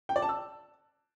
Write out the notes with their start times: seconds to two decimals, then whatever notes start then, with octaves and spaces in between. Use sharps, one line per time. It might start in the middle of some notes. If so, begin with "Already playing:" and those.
0.09 G5
0.16 D5
0.22 A5
0.29 E6